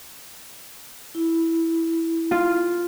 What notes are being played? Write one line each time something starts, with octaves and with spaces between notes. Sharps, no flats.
E4
F4